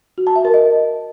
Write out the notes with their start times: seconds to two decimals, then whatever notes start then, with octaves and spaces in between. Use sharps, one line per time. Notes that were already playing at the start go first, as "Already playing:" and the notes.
0.18 F#4
0.27 A5
0.36 E5
0.45 A#4
0.54 D#5